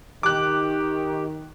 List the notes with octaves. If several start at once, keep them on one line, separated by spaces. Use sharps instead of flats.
D#3 G4 D6 F#6